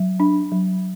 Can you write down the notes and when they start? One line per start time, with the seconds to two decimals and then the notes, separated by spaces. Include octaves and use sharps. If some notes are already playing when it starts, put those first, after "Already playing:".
Already playing: F#3
0.20 D4
0.52 F#3